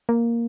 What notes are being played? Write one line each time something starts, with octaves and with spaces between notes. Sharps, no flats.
A#3